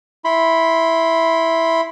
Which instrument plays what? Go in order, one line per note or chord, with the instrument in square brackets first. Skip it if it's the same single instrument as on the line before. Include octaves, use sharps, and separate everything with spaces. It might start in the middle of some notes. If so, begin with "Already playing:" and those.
[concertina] E4 B5 C6